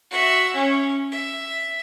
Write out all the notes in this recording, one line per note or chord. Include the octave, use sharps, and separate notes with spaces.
F#4 E5
C#4
E5